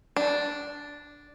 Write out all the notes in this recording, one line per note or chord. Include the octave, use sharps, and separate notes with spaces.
D4